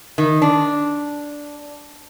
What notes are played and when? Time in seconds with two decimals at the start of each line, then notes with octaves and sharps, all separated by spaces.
0.18 D#3
0.42 D4